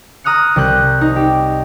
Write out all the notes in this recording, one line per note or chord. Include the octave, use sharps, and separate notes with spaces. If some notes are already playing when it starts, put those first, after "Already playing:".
A#5 D#6 F6 F#6 C#7
C2 G3 F#6 G6
D#4
G4